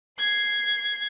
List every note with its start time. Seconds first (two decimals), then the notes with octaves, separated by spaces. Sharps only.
0.19 G#6 C7